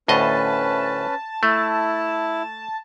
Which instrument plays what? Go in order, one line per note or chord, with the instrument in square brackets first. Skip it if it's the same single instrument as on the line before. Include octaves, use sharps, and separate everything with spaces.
[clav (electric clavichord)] D2 A2 D#5 [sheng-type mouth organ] C#4 B4 [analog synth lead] A5
[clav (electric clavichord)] A3 [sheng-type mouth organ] E4